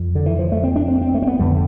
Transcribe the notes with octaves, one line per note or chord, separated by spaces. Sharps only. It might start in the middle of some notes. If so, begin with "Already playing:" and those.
Already playing: F2
D3
E3
F3
A3
C4
D4
C4
C4
A3
C4
B3
F2 D3 G3